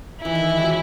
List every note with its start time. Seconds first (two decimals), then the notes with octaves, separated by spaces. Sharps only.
0.22 E3 E4
0.35 D#3
0.49 E3
0.58 F#3 G#3